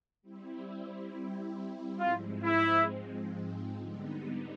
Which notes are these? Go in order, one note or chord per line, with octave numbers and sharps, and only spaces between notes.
G3 C4 E4
G#2 F3 G#3 C4 F4
E4
D3 G3 B3 D#4